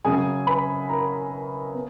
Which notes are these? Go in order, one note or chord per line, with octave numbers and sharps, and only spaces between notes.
F#2 C#3 F#3 G#4 G#5
B4 B5
A#4 A#5
B3